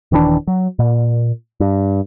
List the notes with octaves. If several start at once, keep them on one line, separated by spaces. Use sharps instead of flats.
D#1 D#3 E3 D4
F#3
A#2
G2